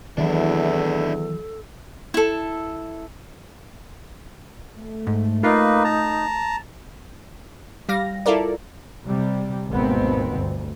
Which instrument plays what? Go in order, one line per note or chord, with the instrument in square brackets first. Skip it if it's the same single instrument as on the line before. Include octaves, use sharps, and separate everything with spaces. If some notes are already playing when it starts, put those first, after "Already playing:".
[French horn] E2 [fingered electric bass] D#3 E3 F#3 [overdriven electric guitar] D4 E4 [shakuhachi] A4
[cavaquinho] E4 A4
[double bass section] A3
[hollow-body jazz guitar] G#2
[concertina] A#3 B4 [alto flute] D#4 [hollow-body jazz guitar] F4 A#4 F5
[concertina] A5 A#5
[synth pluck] G3 F5 A#6
E4 F4 A4 A#4 D5
[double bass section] C3 G3
G#1 D#2 B2 B3 C4
G1 D2